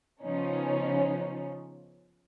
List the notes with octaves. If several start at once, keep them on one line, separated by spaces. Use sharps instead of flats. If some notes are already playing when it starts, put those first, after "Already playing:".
C#3 F3 B3 C#4 D#4